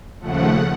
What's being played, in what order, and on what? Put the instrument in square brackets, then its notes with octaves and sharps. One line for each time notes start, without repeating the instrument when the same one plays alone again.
[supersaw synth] D#2 C#3 F3 A3 F#5